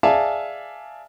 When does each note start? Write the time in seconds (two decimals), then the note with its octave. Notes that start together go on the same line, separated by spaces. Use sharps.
0.03 G#4 D5 E5 F5 G#5 A5